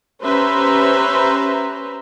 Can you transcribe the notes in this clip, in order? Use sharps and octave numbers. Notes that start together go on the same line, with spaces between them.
C#4 G4 B4 C5 E5 A#5